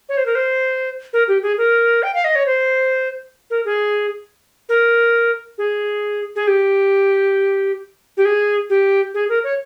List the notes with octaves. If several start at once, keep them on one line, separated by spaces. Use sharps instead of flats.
C#5
C5
A#4
C5
A#4
G4
G#4
A#4
G5
F5
D#5
C#5
C5
A#4
G#4
A#4
G#4
G#4
G4
G4
G#4
G4
G#4
A#4
C#5